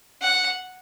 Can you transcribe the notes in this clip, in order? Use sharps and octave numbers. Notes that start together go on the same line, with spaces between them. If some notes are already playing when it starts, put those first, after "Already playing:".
F#5